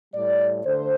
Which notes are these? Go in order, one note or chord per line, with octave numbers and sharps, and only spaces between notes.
A2 G3 D5
D3 A3 C5